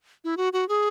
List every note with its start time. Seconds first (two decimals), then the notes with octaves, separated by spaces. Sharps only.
0.24 E4
0.37 F#4
0.53 F#4
0.69 G#4